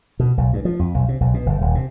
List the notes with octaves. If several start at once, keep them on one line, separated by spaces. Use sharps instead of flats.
B2
B1
G2
F3
F2
B1
C3
B1
B2
G1
D#1
C3